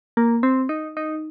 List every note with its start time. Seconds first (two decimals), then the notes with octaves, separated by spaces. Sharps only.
0.17 A#3
0.43 C4
0.69 D#4
0.97 D#4